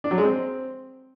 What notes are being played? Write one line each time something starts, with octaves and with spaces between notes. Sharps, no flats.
D4
F#3
G#3
C4